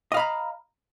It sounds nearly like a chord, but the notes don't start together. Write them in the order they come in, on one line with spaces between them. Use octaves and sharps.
D#5 F5 B5 A#5